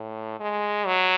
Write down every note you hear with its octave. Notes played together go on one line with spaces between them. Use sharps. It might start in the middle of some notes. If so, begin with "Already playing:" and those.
Already playing: A2
G#3
F#3